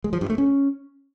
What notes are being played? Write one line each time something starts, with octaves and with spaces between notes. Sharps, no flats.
G#3
F3
G2
A3
C#4